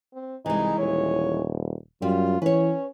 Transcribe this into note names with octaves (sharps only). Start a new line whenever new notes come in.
C4
C2 E3 G#3 D#4
D#1 C#5
F#2 G3 F4
E3 C#4 B4 C#5